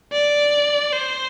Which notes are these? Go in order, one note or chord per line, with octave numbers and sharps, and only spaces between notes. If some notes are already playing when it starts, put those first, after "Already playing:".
D5
C5